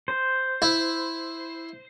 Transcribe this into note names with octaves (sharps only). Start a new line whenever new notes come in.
C5
E4